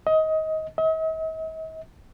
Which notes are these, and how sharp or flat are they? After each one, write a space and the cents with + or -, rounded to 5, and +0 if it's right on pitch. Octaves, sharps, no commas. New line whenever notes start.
D#5 +20
D#5 +45